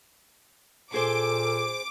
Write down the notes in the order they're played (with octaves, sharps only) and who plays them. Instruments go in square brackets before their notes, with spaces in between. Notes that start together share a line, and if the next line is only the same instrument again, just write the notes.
[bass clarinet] A#2 [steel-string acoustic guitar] G#4 C5 [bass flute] A4 [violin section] D6